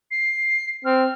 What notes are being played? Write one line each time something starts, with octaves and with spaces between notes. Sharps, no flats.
C7
C4 F6